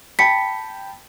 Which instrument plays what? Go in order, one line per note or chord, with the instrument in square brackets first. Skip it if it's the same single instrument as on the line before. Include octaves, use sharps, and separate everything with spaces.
[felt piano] G5 A5 B5 [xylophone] B6 C#7